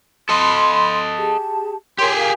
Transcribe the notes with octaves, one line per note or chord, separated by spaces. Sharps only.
A4 D#5 B5 C6
G4 G#4 A5
G4 G#4 A#4 C#5 C6
A#4 F5 G#5